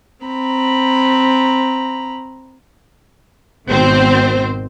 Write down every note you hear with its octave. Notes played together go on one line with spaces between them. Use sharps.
C4 A#5 B5
G#1 B2 C4 C5